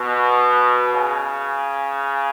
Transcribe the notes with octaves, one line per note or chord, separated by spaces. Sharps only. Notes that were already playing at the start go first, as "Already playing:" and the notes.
Already playing: B2
C#3